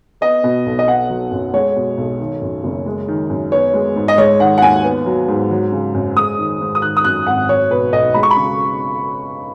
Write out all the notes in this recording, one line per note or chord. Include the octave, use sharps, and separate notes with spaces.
B3 D#5
B2
B1
D#5
B3 F#5
F#3
F#2
G#3 C#5
B2
B1
D#3
F#2
F#1
G#3
D#3
F#2
B3 C#5
G#3
G#2
D#5
G#3 C#5
D#3 F#5
F#5
D#2 G#5
B3
F#3
G#2
F#3
C#3
F#2
G#3 D#6
D#3
G#2
D#6
D#3 F#6
D#6
F#2 F#6
G#1 F#5
F#3 C#5
B2 B4
B1 D#5
G#3 B5
C#6
B5
C#3